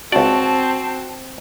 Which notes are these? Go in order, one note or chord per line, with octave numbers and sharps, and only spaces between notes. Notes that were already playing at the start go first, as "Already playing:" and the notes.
C#2 C4 F#4 D5 A5